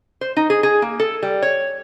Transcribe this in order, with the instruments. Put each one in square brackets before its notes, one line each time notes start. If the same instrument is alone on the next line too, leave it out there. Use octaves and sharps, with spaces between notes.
[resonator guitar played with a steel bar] C5
D#4
G#4
G#4
A#3
A4
G3
C#5